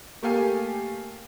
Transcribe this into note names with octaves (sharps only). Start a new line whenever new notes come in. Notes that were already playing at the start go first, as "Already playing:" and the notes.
A3 A#3 G4 A4 F5 G#5